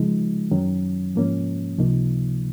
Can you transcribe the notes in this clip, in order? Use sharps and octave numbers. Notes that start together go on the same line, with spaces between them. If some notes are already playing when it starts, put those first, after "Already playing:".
Already playing: C#3 F3 G#3 D#4
F#2 D#3 F#3 C#4
G#2 F3 A#3 C#4
C#2 C3 F3 A#3 D#4